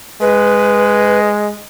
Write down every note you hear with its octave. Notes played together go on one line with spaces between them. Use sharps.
G#3 B4